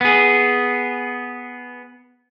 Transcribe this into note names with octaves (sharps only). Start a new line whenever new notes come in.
B3 G#4